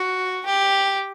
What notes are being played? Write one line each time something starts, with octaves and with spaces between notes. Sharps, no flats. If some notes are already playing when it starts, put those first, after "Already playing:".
Already playing: F#4
G4